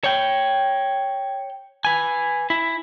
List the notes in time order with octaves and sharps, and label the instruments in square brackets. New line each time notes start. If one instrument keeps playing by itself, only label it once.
[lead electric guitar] C#5 G5
B4 G#5
E4